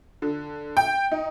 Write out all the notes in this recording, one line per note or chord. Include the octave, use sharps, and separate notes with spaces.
D3
G5
D#4